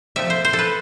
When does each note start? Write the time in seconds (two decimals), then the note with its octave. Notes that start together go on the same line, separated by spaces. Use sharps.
0.16 C3 F3 A3 E5
0.30 C5
0.45 C5
0.53 A4
0.59 B4